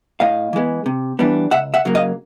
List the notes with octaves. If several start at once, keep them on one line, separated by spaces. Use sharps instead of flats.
A2 D#5 F5
E3 G#3 B3
C3
E3 G3 B3 D4
C#2 E5 F#5
E5 F#5
C#3 F#3 A#3
D#5 F5